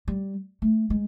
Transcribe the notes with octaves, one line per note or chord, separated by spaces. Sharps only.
G3
A3
G#3